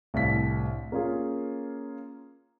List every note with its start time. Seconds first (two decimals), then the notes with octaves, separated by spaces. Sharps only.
0.14 C2 A2 D4 F5 B6
0.92 A#3 C#4 F4 G#4